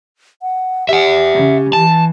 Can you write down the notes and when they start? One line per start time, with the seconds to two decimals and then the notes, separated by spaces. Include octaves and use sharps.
0.42 F#5
0.89 G4 E5 F#5
1.34 C#3
1.73 E3 A5